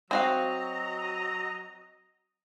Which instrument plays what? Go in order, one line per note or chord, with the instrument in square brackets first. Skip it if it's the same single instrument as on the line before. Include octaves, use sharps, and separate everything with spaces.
[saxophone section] F#3 D#5 [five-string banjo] C4 F#4 F5 [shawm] A#5